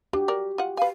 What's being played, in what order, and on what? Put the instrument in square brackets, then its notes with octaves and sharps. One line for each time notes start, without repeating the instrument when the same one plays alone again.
[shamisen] D4 [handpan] F#4 G4
[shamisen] A#4 D5
F4 F#5
[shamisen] B4 G#5 [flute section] F5